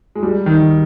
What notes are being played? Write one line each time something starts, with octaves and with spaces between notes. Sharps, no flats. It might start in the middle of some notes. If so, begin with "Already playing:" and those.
G#3
G3
D#3